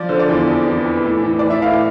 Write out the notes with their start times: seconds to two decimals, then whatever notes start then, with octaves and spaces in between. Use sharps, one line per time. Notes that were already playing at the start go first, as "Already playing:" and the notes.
Already playing: F3 D5
0.09 D3 C5
0.20 D5
0.29 E2
0.47 F2
0.67 E3
0.86 E3
1.04 A2
1.24 E3
1.39 E3 D5
1.50 E5
1.62 A2 F5